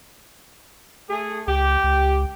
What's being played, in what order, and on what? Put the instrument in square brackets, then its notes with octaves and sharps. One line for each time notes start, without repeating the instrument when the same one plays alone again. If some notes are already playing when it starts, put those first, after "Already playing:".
[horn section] A3 G#4
[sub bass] C#2 [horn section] G4
[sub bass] C#2